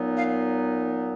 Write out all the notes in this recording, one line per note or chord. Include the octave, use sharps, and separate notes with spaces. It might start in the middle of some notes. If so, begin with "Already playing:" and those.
Already playing: A#2 F#3 B3 D#4
F5